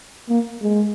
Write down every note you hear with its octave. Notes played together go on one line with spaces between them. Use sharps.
A#3
G#3